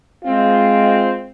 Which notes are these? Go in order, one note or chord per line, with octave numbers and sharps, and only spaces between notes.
G#3 C4 F4